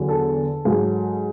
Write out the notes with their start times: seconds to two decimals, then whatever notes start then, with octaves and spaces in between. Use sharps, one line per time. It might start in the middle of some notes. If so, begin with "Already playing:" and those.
Already playing: E2 D3 F#3
0.09 A4
0.65 G#2 F#3